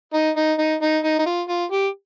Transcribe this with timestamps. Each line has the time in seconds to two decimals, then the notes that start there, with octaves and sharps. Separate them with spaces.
0.14 D#4
0.37 D#4
0.59 D#4
0.82 D#4
1.04 D#4
1.19 D#4
1.26 F4
1.49 F4
1.72 G4